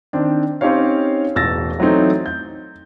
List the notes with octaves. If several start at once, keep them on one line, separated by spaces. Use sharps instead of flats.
D#3 C4 D4
C4 C#4 D#4 G4 C#5 F5
E1 A1 E6 A6 A#6
E3 F#3 A3 C4 D#4
G6